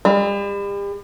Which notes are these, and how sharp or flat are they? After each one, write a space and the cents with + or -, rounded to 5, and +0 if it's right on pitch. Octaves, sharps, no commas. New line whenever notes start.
G3 +40